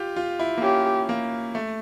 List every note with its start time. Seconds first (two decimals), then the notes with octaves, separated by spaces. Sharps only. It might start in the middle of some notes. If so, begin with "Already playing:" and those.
Already playing: F4 G4
0.16 F4
0.39 E4
0.58 A#3
0.62 C#4 G4
1.09 A#3
1.55 A3